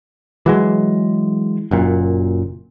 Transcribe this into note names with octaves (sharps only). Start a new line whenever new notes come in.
E3 F#3 G#3
F#1 F#2 A#2